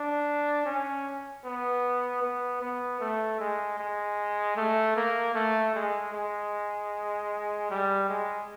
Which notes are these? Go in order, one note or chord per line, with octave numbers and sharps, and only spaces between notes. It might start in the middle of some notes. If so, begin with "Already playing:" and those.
Already playing: D4
C#4
B3
B3
B3
A3
G#3
G#3
A3
A#3
A3
G#3
G#3
G3
G#3